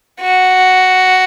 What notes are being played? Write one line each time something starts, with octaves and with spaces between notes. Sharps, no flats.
F#4